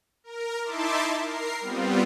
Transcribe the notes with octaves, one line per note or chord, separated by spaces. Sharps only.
A#4
D#4 E4 E5 A5 C6 D6
A#4 C7
G3 B3 C4 F4